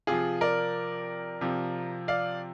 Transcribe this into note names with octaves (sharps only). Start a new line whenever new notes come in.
C3 F3 F4 G#4
A#4 D5
C3 F3
D5 F5